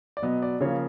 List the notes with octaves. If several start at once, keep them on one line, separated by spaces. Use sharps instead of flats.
D5
B2 F#3 B3 D#5
D5
C#3 F3 A#3 C#5